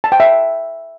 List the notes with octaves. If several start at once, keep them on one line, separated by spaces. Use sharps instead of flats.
A5
G5
E5